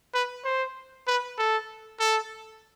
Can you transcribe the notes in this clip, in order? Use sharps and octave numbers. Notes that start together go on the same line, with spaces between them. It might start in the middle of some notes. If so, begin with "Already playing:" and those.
B4
C5
B4
A4
A4